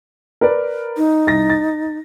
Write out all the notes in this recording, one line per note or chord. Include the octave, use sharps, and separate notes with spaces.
A#4 B4 D5
D#4
C2 A6 A#6
A6